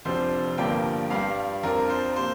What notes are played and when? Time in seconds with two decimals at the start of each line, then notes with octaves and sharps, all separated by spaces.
0.05 F1 F2 C3 F3 D4 C5
0.58 G1 G2 F3 A#3 D4 G5
1.10 G2 G3 D4 F5
1.63 F2 F3 D4 A#4
1.89 C5
2.16 C3 A#3 C5